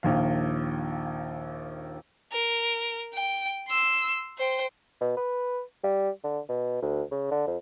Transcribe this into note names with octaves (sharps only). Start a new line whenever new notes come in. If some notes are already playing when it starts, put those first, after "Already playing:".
A#1 D#2 F5
A#4
G5
C6 E6
C5 G5
B2
B4
G3
D3
B2
D2
C#3
D3
F2